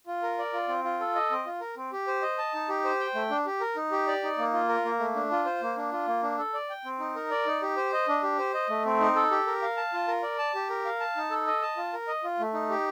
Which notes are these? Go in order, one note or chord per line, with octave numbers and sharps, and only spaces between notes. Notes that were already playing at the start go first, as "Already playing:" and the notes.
F4
A#4
D5
F4
C4
F4
A4
D#5
C4
F4
A#4
C4
G4
C5
D#5
A5
D#4
G4
C5
G5
A3
D4
G4
A#4
D#4
G4
D5
D#4
A#3
F4
A#4
A#3
A3
D4
F4
C5
A#3
D4
F4
A#3
D4
A4
D5
G5
C4
D#4
A#4
D5
D#4
G4
C5
D#5
D4
G4
C5
D#5
A3
C4
D#4
A4
G4
A#4
F5
A5
F4
A#4
D5
A5
G4
A#4
F5
A5
D#4
A4
D#5
A5
F4
A#4
D#5
F4
A3
D#4
G4